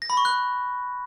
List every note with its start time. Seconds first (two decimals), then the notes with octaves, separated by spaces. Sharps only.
0.02 A#6
0.10 B5
0.17 C#6
0.25 F#6